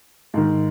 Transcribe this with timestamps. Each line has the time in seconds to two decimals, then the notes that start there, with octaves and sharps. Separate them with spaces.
0.34 G#2 D#3